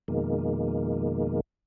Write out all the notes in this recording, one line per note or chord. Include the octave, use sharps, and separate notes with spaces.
F2 B2 D#3 G#3 A#3